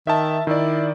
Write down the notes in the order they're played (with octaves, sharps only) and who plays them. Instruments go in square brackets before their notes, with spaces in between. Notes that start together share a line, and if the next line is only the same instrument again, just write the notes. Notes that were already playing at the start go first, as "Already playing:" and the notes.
[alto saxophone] D#3 [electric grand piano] E5 A5
[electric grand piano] D#3 D5 [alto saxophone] E4